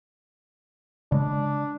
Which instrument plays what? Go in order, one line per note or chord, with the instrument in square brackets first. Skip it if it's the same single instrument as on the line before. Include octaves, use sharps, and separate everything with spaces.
[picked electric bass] C#3 G#3 [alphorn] D4